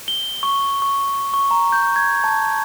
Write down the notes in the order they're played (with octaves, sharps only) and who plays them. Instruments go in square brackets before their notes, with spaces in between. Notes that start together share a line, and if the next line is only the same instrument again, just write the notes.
[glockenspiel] G7
C#6
C#6
C#6
A#5
G6
G#6
A5